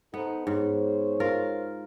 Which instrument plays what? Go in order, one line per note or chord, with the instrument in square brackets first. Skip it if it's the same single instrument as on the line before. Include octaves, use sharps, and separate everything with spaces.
[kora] B3 [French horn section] D#4 A4 C5
[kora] G#2 [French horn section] G#4 C5 C#5
[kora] F4 A#4